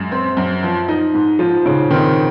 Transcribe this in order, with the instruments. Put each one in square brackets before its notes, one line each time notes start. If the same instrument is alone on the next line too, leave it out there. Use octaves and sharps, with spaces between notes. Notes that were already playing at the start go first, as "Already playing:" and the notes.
Already playing: [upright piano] F#2 [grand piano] G#3
[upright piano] C4
F#2
F3
D#4
G#2
[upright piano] G#2 [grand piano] F3
[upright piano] G#2 [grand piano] C#3
[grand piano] D#3 [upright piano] C4